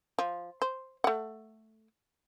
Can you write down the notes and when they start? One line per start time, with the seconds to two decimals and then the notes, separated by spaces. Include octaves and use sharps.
0.19 F3
0.62 C5
1.04 A3 F#5